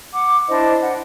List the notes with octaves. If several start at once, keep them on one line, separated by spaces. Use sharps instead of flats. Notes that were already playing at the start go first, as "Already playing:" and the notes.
F#5 D6
D4 E4 C5 D#5
F#5